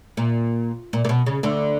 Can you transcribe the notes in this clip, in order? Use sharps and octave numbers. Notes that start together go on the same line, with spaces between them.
A#2
A#2
A#2
B2
C#3
D2 D3